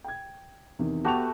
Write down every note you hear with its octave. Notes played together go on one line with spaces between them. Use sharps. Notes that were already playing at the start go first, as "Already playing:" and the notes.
G5 G#6
E2 C3 D#3
A3 B3 F#4 G4 A5 F7